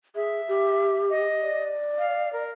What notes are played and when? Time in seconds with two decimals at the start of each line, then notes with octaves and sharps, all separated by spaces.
0.16 G#4 E5
0.48 G4
1.10 D#5
1.42 D5
1.98 F5
2.33 A#4